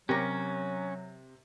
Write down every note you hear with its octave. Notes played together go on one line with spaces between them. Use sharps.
C3 F#3 C#4 G4 A#4 C#6 A#6